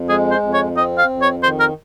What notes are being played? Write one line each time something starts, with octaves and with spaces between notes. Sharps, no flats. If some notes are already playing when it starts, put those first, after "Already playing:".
Already playing: F2
G#3 G#4
C5
F2
C#5
C4 D#5
F5
F2
C#5
D#3 C5
A#4